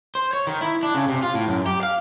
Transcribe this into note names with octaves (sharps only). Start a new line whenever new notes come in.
C5
C#5
D#3
E4
D4
C#3
C3
F4
A2
F#2
G4
F5